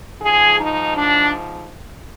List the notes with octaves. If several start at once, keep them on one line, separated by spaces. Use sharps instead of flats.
G#2 F3 G#4
D#4
D4